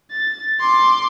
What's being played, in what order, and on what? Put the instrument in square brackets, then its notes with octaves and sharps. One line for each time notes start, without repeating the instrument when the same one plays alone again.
[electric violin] A6
C6 D6